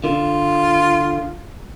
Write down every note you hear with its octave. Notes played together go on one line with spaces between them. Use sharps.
D3 F4